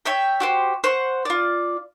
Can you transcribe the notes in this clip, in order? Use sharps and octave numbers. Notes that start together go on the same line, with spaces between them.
C#5 E5 G5
F#4 G4 C5
C5 F#5 C#6
F4 D5